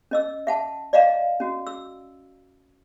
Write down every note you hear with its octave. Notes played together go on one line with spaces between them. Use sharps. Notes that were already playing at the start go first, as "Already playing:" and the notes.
C#4 D#5 E6
E5 F#5 A5
D5 D#5 F5 F#5 A#5
C#4 F#4
E6